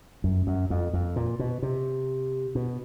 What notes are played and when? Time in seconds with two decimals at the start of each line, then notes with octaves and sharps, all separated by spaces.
0.24 F#2
0.47 F#2
0.70 F2
0.93 F2
1.16 A#2
1.39 B2
1.62 C3
2.55 B2